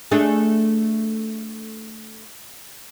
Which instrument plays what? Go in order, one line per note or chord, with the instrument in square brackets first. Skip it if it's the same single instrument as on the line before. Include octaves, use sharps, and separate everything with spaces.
[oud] A3 D4 G#4